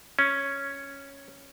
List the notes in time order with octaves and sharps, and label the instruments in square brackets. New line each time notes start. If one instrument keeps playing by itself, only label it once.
[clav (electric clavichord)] C#4